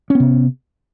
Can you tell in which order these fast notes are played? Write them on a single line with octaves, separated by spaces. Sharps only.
C#4 B3 C3